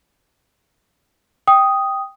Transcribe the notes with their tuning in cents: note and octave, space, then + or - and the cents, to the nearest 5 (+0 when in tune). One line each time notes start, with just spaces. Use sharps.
G5 +0 D#6 +0